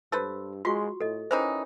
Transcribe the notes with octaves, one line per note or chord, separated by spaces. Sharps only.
G2 A4 B4 C5 E6
G#3 F4 F#4 C6 C#6
A2 A4 D#5
D#3 E3 C#4 D#4 C5